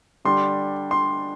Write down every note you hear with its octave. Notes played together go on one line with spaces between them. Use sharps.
D3 G3 D4 C6
C6